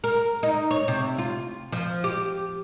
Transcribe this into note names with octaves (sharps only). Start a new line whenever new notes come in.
A#4
D#4
C#5
C3
F4
F3
G4